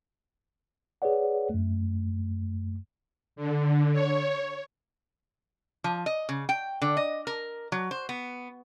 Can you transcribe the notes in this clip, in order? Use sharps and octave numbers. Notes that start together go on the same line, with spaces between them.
G#4 B4 C#5 D5 F#5
F#2 A3
D3
C#5
F3
D#5
C#3
G5
D3
D#5
A#4
F#3
C5
B3